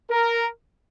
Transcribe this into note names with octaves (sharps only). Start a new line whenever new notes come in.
A#4